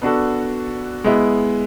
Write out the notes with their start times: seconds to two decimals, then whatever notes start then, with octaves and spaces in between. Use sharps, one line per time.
0.02 B3 D4 F#4 A4
1.04 G#3 B3 E4